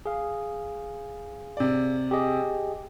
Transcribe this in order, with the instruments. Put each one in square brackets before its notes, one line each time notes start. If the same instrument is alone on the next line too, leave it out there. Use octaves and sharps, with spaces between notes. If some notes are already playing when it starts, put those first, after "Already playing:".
[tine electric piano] G#4 F5
[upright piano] C3 D5
[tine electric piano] G4 G#4 D#5